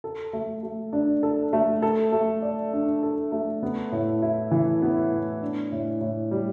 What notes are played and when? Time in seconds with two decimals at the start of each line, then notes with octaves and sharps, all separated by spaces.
0.04 A4
0.33 A3
0.63 A3
0.93 D4
1.23 A4
1.53 A3
1.82 A4
2.12 A3
2.42 D5
2.73 D4
3.03 A4
3.32 A3
3.63 B3
3.92 A2
4.22 E4
4.51 E3
4.82 B3
5.11 A2
5.42 D4
5.72 A2
6.01 A2
6.31 G3